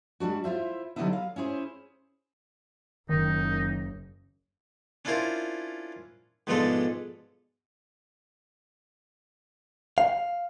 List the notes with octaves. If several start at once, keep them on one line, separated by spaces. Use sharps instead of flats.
G3 G#3 D4 F#4
E4 F4 C5 E5
D3 F#3 G3 B3 D#4 E4
F5
C#4 E4 G#4 C5
F#1 D#3 D#4
C#4 D4 E4 F4 A#4 C5
G#2 B2 F3 G#3 D4 A4
F5